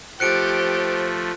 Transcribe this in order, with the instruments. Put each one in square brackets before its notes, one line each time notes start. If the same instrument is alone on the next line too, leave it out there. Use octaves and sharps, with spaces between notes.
[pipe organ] F3 A3 [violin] G4 [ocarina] C5 [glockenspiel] F#6 C#7 D7